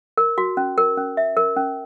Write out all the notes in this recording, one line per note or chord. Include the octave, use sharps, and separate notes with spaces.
A#4
F#4
C#4
A#4
C#4
E5
A#4
C#4